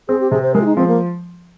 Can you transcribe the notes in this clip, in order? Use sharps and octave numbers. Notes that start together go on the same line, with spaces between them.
C4 G#4
G4
C3 G#4
C5
G#3 A#4
F4
D#4
F3 C4
A#3